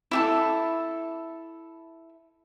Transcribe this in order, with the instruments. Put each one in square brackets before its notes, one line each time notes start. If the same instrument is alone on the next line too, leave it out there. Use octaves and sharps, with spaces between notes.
[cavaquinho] E4 G4 A4